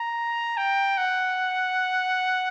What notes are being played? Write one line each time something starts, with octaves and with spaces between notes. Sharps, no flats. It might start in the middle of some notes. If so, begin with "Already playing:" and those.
Already playing: A#5
G5
F#5